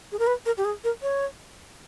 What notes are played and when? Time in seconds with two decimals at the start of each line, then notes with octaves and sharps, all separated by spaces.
0.12 G#4
0.19 A#4
0.27 B4
0.46 A#4
0.57 G4
0.65 G#4
0.84 A#4
1.02 C#5